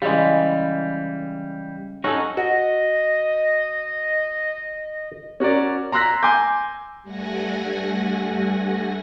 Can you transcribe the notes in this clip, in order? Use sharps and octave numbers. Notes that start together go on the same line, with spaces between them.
C#3 E3 G3 G#3
C#4 D#4 F#4 A4
F#4 D#5
C#4 F#4 A#4 D5
A#5 C6 E6 F#6 A#6 B6
G#5 C6 D6 G6
G2 G3 A3 F#5 G#5 A#6